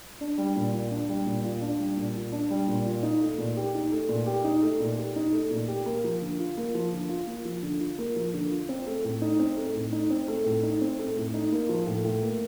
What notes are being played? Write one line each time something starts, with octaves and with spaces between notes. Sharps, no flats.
D4
G3
A#2
F4
D4
G3
A#2
F4
D4
G3
A#2
F4
D4
G3
A#2
F4
D#4
A3
A#2
G4
D#4
A3
A#2
G4
D#4
A3
A#2
G4
D#4
A3
A#2
G4
A#3
F3
D3
F4
A#3
F3
D3
F4
A#3
F3
D3
F4
A#3
F3
D3
F4
C4
A3
A2
D#4
C4
A3
A2
D#4
C4
A3
A2
D#4
C4
A3
A2
D#4
A#3
F3
A2
A2
A#3